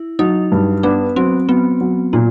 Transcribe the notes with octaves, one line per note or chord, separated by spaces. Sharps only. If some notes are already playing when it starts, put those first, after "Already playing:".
Already playing: E4
F#3 D#4
G2
B3 D4
F#3 C4
F#3 B3
F#3
A#2 A#3